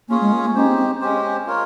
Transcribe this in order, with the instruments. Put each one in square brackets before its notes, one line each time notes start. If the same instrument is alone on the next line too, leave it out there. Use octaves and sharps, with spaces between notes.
[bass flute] A#3 [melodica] C#4 F4 G#4 C#5
[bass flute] G#3
A#3
A#3
[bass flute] C#4 [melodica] D#4 G4 C5
[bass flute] C4
C4
[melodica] G#3 C#4 G4 C5
F4 A#4 C#5